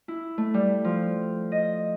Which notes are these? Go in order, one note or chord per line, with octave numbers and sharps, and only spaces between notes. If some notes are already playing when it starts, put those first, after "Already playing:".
E4
A3
G3
F3
D#5